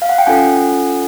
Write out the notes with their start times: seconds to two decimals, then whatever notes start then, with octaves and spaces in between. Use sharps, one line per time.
0.02 F5
0.09 F#5
0.18 G5
0.26 C#4 F4 A4 F#5 G#5